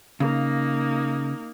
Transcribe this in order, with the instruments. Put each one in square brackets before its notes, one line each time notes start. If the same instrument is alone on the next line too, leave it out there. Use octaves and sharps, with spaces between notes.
[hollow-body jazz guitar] C#3 [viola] A#3 D#4